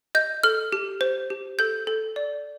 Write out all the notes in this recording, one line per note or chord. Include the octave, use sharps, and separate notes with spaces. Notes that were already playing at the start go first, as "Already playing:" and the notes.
D#5 G6
A4 F6
G4
C5
G4
A4 G6
A4
D5